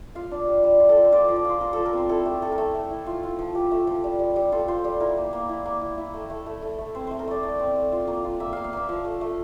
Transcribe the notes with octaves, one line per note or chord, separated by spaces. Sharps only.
F4 F5
D4
G3
G3
F4
A4
F4 A#4
C5
F4 D5
F3 D5
D5
F4 C5
F4 A#4
F3 A4
A#4
C4 C5
E4 A4
A3 G4
A3 A4
A#4
A3 A4
A3
E4
F4
F4
F3
F3 G4
A3
F3
G3
G3
G3
F4 A4
F4 C5
G3
E4 A#4
A#3
A#3
E4
A#3
E4
E4
A3
A3
A3
A3
A3
C4 C5
A3 C5
A#4
A3 D5
A3 D5
C4
A3
F4
A#3
F4
A#3 E5
A#3 F5
F5
A#3 E5
F3 F5
A3
A3